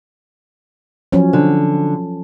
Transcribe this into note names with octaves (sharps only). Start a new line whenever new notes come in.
F3 F#3 C#4
D3